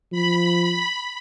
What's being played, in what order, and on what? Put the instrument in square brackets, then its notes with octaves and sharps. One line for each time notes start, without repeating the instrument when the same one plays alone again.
[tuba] F3 [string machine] B5